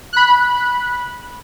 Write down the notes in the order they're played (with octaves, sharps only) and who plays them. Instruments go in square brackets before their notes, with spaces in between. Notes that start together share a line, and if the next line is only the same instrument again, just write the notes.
[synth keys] B5 F#6